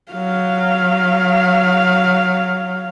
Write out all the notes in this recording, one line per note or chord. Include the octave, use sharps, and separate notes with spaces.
F#3 F5